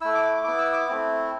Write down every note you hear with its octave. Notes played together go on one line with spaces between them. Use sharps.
A3 E4 E6
D6
D6
B3 E4 D6
E6
D6
A3 C4 E4